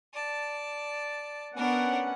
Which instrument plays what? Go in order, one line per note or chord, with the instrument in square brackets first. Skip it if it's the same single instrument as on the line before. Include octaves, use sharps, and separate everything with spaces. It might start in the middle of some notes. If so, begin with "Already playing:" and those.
[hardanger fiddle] D5 A5
[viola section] B3 C#4 F#5 [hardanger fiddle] D4 A#4